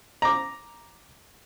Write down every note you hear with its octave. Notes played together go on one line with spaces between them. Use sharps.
A#5 D6